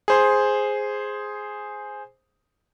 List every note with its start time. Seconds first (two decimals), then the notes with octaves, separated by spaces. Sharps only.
0.08 G#4 C5 C6